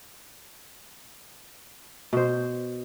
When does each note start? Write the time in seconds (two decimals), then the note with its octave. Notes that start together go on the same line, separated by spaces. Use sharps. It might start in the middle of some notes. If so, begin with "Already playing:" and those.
2.13 B2 C5